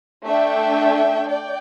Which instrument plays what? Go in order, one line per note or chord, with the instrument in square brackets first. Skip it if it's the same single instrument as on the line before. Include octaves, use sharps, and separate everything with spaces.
[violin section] A3 D4 A4 E5 G5
D5 G5